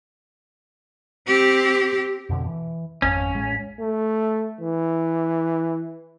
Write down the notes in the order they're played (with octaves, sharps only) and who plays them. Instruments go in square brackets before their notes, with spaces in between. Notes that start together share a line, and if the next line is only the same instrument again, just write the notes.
[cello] C4 G4
[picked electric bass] F2 B2 D3
E3
[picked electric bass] G#1 F2 [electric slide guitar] C#4
[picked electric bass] A1 G#3
[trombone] A3
E3